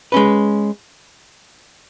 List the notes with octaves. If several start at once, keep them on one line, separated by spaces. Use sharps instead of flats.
G#3 C#4 B4